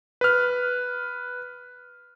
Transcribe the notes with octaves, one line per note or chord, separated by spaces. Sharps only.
B4 F6